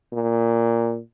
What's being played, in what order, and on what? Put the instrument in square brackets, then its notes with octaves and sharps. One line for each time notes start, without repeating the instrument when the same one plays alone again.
[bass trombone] A#2